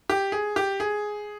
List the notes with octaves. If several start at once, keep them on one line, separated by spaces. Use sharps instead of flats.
G4
G#4
G4
G#4